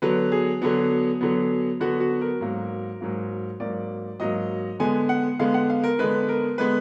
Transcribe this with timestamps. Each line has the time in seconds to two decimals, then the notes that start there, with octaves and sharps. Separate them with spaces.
0.02 D3 F#3 B3 B4
0.32 G#4
0.62 D3 F#3 B3
1.21 D3 F#3 B3
1.80 D3 F#3 B3 F#4
2.00 F#4
2.21 A#4
2.41 G#2 F#3 A#3
3.01 G#2 F#3 A#3
3.60 G#2 F#3 A#3 D5
4.20 G#2 F#3 A#3 D#5
4.80 D3 G#3 B3 G#5
5.09 F#5
5.39 D3 G#3 B3 F5
5.54 F#5
5.70 F5
5.84 A#4
5.99 D3 G#3 B3 B4
6.29 A#4
6.58 D3 G#3 B3 B4